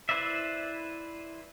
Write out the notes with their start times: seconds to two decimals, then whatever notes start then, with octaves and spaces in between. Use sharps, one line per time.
0.09 E4 B4 C5 D5 E5